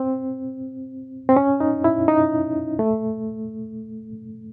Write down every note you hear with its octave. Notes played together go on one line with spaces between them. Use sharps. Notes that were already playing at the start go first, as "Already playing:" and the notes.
Already playing: C4
C4
C#4
D#4
E4
D#4
A3